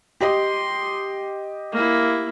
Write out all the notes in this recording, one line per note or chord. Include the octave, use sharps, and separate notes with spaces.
G4 D#5 C6
A#3 E4